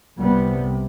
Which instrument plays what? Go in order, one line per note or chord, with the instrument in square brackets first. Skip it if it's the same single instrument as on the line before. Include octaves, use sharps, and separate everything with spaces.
[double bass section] C2 C3 G3 B3